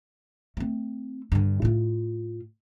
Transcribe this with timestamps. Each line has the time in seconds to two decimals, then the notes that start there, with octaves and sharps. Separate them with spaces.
0.57 A3 C4
1.32 G2 D3
1.62 A2 F4